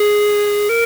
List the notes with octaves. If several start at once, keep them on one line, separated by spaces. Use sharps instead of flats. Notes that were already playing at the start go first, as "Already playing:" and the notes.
Already playing: G#4
A#4